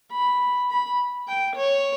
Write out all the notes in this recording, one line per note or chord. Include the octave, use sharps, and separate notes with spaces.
B5
B5
G5
C#5